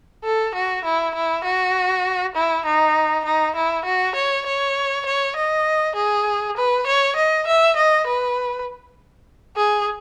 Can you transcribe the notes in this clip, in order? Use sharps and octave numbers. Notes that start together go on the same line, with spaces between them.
A4
F#4
E4
E4
F#4
E4
D#4
D#4
E4
F#4
C#5
C#5
C#5
D#5
G#4
B4
C#5
D#5
E5
D#5
B4
G#4